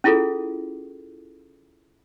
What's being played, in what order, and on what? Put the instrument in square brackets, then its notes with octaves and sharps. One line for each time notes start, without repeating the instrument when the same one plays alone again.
[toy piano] C#4 E4 F4 G#4 A4